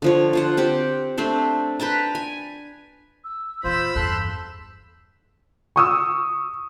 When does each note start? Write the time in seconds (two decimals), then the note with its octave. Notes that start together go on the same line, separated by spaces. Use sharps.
0.02 D3 F3 C#5
0.33 F4 C5 F#5
0.57 C4 G4 F#5
1.18 A3 C4 D4 C5
1.80 B4 G5 A5 A#5
2.15 G#5
3.24 E6
3.64 E2 A#2 F4 C5 B5 E6 G6
3.96 E2 G2 A4 C6 F#6 G6
5.76 C#6 D#6 E6